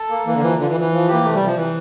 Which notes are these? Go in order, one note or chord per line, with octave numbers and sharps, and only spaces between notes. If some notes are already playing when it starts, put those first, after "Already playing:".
Already playing: A4
A#3
E3 A#3
D3
E3 F3
D3 F3
E3
F3
E3
F3
G4
A#3
C3 A3
G3
C3
F3
C3 E3